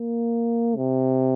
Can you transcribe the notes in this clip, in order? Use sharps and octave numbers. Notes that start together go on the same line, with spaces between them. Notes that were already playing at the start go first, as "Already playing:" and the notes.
Already playing: A#3
C3